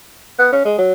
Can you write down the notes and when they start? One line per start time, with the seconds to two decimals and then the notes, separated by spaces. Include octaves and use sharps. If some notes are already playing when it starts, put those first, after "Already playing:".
0.39 B3
0.52 C#4
0.65 G#3
0.78 F#3